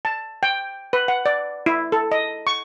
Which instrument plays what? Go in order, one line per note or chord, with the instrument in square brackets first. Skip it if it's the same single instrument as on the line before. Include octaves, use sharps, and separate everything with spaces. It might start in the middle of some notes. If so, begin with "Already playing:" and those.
[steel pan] A5
G5
B4
F#5
D5
E4
A4
D#5
C#6